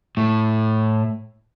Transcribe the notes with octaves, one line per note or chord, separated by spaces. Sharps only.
A2